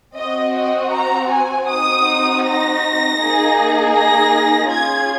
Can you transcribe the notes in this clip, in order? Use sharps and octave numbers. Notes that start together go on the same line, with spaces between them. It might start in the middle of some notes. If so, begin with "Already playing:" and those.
C4 F#4 D#5
D#5
A#5
G#5
C4 D#4 F#4 D#6
A#6
A#3 D#4 G#4
A#6
C#4 F4 G#4 G#6